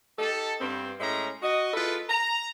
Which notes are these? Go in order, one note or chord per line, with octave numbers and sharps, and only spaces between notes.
D#4 G4 A4
G2 B3 C4
A2 G#3 C#4 E5 A#5
F#4 D#5
G#3 E4 F4 A4 B4
A#5